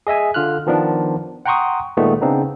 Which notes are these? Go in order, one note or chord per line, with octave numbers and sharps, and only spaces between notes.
G#4 D#5 E5 G#5
D3 F4 F6 F#6
D#3 F3 B3 D4
F#5 G5 A#5 C6 C#6 D#6
A#2 D#3 G#3 A3 B3
C#3 B3 C4 D4 D#4